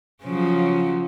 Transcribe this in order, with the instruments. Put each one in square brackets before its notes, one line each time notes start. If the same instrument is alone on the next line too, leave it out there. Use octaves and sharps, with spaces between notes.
[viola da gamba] C#3 F3 F#3